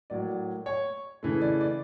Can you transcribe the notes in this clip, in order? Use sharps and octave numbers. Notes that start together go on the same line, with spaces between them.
A2 F#3 A#3 D5
C#5
C#3 E3 A3
D5
D5